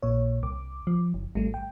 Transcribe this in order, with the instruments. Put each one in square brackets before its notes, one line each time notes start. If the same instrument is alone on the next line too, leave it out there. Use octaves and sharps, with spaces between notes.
[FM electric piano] A#1 A#2 C#5
[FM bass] C2 [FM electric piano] D6
[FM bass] F3
F#1
[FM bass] G#1 [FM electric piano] G3 A3
[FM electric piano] G5